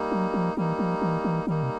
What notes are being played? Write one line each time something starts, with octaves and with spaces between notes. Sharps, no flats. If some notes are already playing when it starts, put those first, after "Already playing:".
Already playing: G3 A#3 D#4
F#3
F3
E3 G3 A#3 D#4
F3
E3
E3
D#3 G3 A#3 D#4
C3